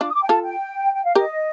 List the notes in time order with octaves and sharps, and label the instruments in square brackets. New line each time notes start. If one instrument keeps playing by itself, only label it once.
[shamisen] D4 F4 [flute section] D6
[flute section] D#6
D6
G5
[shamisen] F4 A4 [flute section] A5
[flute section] G5
G5
F5
[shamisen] G4 A#4 [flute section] D#5